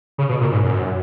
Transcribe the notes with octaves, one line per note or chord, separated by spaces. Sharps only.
C#3
B2
A#2
G#2
F#2